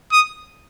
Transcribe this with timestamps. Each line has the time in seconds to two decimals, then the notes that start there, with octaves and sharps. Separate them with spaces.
0.12 D#6